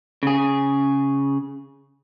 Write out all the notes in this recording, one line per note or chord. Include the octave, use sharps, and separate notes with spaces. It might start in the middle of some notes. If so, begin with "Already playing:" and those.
C#3 G#4